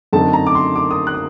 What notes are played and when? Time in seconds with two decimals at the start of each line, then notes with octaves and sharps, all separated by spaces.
0.13 F#2 D3 A3 C4 D#4 A5
0.33 A#5
0.47 D6
0.55 C6
0.75 D6
0.91 D#6
1.07 F#6
1.14 D#6